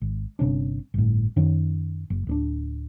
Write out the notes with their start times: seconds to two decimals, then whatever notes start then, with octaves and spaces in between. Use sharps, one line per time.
0.01 G#1
0.39 G1 C3 C#4 D4
0.94 G1 A2
1.36 F#2 D#3 C#4
2.10 F#1
2.27 D1 B3 D4